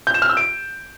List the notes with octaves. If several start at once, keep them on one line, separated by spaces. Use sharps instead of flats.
G6
E7
F6
E6
D7